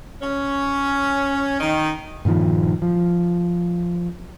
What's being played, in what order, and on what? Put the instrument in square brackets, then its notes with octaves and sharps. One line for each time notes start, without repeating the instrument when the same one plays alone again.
[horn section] C#4
D#3
[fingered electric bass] G2 A#2 D#3 F3
F3